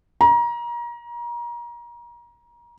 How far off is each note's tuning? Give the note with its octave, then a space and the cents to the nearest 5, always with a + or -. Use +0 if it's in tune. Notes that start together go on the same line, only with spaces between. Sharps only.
A#5 +30